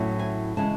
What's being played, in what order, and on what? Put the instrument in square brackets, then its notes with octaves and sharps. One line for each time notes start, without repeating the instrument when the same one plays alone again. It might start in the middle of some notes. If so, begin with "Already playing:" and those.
Already playing: [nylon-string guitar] A2 F#3 C#4 E4
G#5
C#3 E3 G#3 C#4 A5